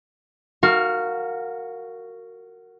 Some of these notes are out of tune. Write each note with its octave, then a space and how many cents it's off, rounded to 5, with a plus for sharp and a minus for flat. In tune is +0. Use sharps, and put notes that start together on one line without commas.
F#4 +0 A#4 -15 F5 +15